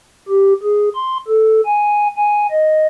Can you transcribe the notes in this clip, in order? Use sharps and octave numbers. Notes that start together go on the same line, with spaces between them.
G4
G#4
C6
A4
G#5
G#5
D#5